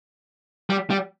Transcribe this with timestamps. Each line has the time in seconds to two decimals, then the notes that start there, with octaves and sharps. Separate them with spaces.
0.70 G3
0.90 G3